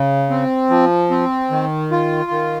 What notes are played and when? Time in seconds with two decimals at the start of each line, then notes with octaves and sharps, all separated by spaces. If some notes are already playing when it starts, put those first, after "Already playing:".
Already playing: C#3
0.30 C4
0.70 F3
1.10 C4
1.51 D#3
1.91 F4
2.31 D#3